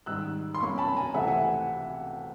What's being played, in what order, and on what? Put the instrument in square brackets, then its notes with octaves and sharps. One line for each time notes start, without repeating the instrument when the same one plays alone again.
[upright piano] G#2 D#3 G3 E6 F#6
C6
B2 F#3 A#3 C#4 B5 C#6
A5 B5
G#5 A#5
C#2 C3 E3 A3 E5 F#5
F#5 G#5